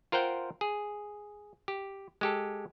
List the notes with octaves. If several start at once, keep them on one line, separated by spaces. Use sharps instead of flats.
F4 A#4 C5 F#5 G5
G#4
G4
G#3 G4 A4